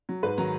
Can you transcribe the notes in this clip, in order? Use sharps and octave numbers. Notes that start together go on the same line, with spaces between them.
F#3
G#2 B4
D#3 F#3 A#5